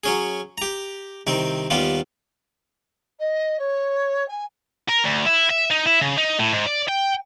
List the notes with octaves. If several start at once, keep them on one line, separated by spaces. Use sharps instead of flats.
F#3 C#4 G#4
G4 A#5
C2 D#3 C4
D#2 G3 B3 F4
D#5
C#5
G#5
A#4
D2
E4
E5
D#4
E4
C#3
D#4
A2
G#2
D5
G5